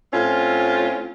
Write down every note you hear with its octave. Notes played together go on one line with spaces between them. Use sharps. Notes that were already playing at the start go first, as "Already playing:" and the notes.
A2 C4 C#4 F4